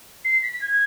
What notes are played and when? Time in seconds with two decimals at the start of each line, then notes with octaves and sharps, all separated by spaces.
0.24 C7
0.42 B6
0.53 B6
0.61 G#6